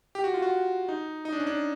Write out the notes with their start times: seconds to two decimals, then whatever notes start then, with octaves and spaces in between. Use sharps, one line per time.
0.15 G4
0.24 F#4
0.34 F4
0.42 F#4
0.88 D#4
1.25 D#4
1.33 D4
1.40 C#4
1.47 D4